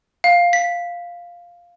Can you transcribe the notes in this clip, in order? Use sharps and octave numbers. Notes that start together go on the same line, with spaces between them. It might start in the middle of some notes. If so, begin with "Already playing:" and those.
F5
B6